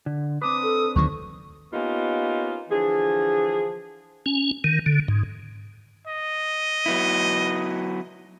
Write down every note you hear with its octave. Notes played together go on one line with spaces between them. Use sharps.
D3
C4 D4 B4 D6 D#6
A4
D2 D#3 F#3 C#6
A#3 B3 C#4 D#4 F4 G4
D3 E3 F3 G#4
C#4
D#3
D3
G#2
D#5
F#3 B3 E4